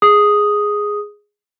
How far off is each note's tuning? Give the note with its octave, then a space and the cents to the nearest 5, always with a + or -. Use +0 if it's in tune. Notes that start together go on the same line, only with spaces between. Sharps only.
G#4 +0 D#6 +0